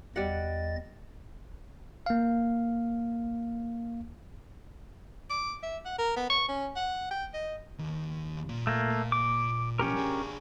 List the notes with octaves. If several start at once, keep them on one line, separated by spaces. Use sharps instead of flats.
E2 G3 D#5 F#5 A6
A#3 F5
D6
E5
F#5
A#4
B3
C#6
C#4
F#5
G5
D#5
D#2
A#2
A3 A#3
D6
B1 F3 C#4 G4 A#4
D4 G#4